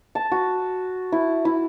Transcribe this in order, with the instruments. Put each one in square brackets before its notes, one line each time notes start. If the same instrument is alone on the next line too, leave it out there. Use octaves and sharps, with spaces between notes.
[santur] A5
F#4
E4
E4